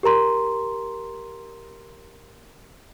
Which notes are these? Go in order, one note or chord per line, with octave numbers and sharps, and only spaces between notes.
G4 A#4 A#5 C6